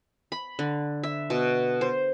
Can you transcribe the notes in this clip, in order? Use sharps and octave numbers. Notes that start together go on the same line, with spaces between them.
B5
D3
E5
B2
C5